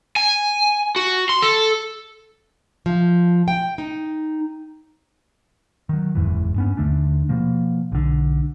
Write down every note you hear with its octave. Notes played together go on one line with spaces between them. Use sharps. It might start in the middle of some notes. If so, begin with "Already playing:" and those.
G#5
F#4
C6
A4
F3
G5
D#4
D#3 F#3
F#1 E2 G#2 E3
G2 B3 C#4
D#2 D3 A3 D4
B2 F3 A#3
B1 D3